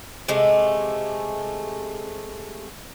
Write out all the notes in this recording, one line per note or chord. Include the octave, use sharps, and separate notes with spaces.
C3 G#3 A3